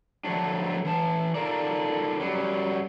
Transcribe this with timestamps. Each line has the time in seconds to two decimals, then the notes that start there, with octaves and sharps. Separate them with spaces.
0.24 D3 F3 F#3 A3 D4
0.85 E3 A5
1.35 D#4 F4 A4 A#4 D5
2.20 F#2 F#3 G3